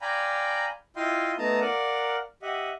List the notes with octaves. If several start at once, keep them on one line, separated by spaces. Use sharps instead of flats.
D5 F5 G5 G#5 A#5 B5
E4 F4 D#5 F5 G5 C6
A3 B3 D#4 A5 A#5 D#6
A#4 D5 F5 F#5
G4 D#5 E5 F#5